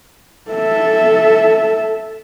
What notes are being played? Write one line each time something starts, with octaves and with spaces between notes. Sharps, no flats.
A4 E5